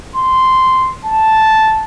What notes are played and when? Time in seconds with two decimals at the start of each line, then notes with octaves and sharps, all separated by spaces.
0.16 C6
1.05 A5